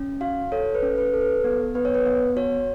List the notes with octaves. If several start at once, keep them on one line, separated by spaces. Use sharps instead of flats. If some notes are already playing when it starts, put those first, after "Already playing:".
Already playing: C#4
F#4 F5
A4 C#5
B4
C#4
B4
A4
B4
B3
B3 B4
C#5
B4
B3
F#4 C#5